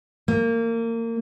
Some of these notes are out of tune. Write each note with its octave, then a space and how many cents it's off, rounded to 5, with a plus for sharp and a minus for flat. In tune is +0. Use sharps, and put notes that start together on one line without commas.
A#3 -25